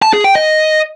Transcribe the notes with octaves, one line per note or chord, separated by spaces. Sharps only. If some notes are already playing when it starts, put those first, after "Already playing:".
A5
G#4
G5
D#5